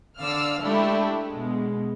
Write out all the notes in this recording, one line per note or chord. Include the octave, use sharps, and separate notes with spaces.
D3 D5 F5 E6 F6
G#3 A3 D4 E4 G4
B2 G#3